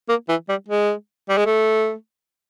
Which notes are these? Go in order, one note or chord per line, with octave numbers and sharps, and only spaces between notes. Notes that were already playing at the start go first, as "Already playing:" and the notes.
A#3
E3
G3
G#3
G3
G#3
A3